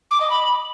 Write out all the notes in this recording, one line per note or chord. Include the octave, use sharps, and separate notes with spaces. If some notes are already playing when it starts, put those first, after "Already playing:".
D6
D#5
B5